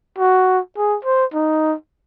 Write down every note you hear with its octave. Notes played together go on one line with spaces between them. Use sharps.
F#4
G#4
C5
D#4